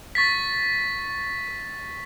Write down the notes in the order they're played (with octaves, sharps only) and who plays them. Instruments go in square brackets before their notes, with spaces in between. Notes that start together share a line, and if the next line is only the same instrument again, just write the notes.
[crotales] C#6 A6 B6